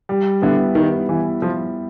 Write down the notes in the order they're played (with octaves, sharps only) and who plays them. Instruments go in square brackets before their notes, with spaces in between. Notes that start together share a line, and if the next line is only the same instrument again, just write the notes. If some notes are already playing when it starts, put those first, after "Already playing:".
[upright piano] G3
[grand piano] D3 [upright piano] B3 E4
[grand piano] D#3 [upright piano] G3
[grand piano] E3 [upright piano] B3 E4
[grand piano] F3